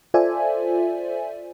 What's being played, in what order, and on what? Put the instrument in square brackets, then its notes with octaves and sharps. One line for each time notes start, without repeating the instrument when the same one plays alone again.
[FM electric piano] F4 A4 C5 D5 E5 G#5